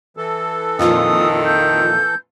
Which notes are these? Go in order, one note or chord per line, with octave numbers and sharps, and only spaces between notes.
E3 A4
F2 A#2 D#3 F4 D#6
G6